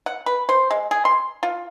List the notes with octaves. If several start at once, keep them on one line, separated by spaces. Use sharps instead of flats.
F#5
B4
C5
G#3
G#4
C6
F4